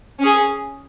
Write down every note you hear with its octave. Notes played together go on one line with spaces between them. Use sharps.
C#4 G#4